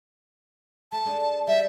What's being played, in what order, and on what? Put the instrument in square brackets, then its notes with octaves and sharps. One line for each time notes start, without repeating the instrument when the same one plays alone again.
[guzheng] A3 [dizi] A5
[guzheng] G#3 D4 D#4
[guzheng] G3 [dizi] E5